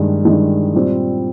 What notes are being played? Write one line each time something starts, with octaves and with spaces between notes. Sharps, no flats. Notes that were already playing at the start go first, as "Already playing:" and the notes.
Already playing: G2 D#3 G#3
G2 D#3 G#3
A#2 G3 C4